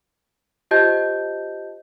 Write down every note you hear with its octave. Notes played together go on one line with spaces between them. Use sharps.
F4 G4 C5 D#5 A5 G6